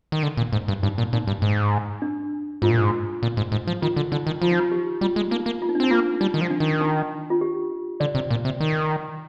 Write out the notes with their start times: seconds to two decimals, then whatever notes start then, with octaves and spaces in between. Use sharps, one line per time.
0.12 D#3
0.23 D3
0.37 A#2
0.53 G#2
0.68 G2
0.83 G2 D#4
0.98 A#2
1.13 A#2 D#4
1.27 G2
1.42 G#2
2.02 D4
2.62 G#2 F4
2.70 A#2
2.78 G#2
3.23 A#2
3.37 G#2
3.52 G#2
3.68 F3
3.82 D#3 F4
3.96 D3
4.12 D3 D#4
4.27 D#3
4.42 F3 F4
4.51 D#4
4.59 F4
4.72 G4
5.01 G3 F4
5.16 G#3
5.31 A#3 D#4
5.46 A#3
5.62 F4
5.69 D#4
5.75 D4
5.80 C4 D#4
5.91 A#3 F4
6.20 G3 D#4
6.34 D#3
6.41 F3
6.50 D4
6.60 D#3
6.81 D#4
7.30 F4
7.41 G4
8.00 D3 D5
8.15 C3
8.30 A#2
8.45 C3
8.60 D#3